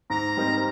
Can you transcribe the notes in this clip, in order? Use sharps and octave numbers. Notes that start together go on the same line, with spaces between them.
G#2 A#5
G3 C4 D#4 A#4